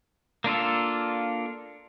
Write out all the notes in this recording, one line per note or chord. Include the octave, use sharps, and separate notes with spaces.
A#3 D4 F4 A4